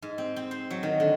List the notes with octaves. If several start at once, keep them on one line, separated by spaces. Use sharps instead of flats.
G#2
C4
C4
C5
F#3
D#3
D3